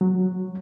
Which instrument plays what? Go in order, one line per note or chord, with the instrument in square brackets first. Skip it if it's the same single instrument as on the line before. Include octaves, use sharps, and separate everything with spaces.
[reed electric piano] F#3